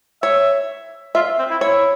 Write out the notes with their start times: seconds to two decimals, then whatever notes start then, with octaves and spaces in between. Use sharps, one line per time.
0.23 C#5 E5
1.15 F4 E5
1.39 C4
1.50 E4
1.61 E4 C#5